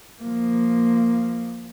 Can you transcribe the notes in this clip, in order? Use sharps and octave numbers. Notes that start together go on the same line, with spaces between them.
F3 A#3